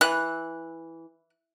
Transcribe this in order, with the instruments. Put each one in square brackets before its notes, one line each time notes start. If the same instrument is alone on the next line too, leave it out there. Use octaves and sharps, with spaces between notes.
[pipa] E3 [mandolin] F#6